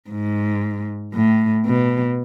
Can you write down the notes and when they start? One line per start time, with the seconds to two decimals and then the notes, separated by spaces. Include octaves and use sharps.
0.10 G#2
1.14 A2
1.66 B2